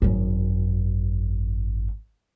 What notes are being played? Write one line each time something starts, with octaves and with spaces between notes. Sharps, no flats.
G#1 F#2